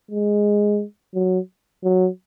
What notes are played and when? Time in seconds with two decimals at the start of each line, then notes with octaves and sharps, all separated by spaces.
0.11 G#3
1.15 F#3
1.84 F#3